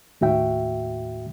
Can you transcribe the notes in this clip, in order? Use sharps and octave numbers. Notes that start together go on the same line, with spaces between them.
D#2 A2 F#4 E5 G5